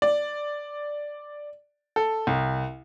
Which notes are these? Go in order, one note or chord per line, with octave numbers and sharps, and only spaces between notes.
D5
A4
C2